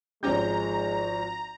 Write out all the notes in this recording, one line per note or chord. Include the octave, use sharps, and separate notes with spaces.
G#1 F3 G#3 C#4 D#4 G4 A#5 G6